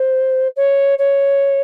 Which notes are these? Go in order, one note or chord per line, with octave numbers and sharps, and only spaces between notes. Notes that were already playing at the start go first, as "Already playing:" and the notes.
Already playing: C5
C#5
C#5